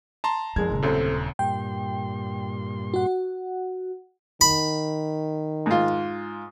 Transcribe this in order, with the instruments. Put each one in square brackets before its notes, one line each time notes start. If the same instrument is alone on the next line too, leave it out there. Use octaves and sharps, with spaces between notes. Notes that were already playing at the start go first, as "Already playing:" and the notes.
[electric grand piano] A5 A#5 C6
[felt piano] F#1 G#3 G#6 [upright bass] F3
[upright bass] D#1 C#3
[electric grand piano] C2 F#2 [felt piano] A3 C4 A4
[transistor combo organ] G2 A#2 C6 [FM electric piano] G5
[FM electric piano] F#4 F#5
[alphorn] D#3 [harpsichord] B5
[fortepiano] G#2 F4